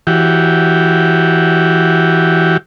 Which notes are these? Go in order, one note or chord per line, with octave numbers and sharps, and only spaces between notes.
E3 F#4 G4